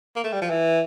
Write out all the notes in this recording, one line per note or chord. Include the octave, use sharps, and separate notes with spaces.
A#3
A3
G3
F3
E3